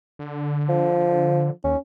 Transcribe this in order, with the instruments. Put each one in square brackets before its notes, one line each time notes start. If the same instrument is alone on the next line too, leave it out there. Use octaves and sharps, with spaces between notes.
[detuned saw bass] D3
[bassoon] F3
[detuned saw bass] D#2 [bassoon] C#4